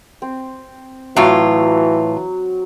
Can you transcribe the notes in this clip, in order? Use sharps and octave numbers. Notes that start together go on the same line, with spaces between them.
C4
A2 E3 F#3 F4